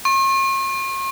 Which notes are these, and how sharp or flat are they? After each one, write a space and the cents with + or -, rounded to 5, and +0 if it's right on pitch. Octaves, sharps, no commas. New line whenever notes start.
C#6 -45